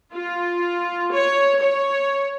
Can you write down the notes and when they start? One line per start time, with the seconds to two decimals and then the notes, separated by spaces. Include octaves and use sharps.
0.14 F4
1.13 C#5
1.61 C#5